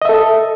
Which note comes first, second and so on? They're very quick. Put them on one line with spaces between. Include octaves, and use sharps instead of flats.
D#5 E5 A4